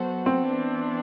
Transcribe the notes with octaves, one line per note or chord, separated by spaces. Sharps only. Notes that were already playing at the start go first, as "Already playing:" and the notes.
Already playing: F#3 B3 F#4 A4 C5
C4
E3 B3 D4